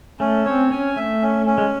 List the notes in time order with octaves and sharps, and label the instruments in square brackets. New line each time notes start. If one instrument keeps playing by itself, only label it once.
[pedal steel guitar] A3 [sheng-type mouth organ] C#4
[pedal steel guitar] C4 [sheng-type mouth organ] C#5
[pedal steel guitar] C#4 [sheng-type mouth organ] G#5
[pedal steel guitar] A3 [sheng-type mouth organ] E5
[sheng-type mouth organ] C#4
C#4
[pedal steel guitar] G#3